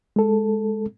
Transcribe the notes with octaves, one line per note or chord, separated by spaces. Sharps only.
G#3 A4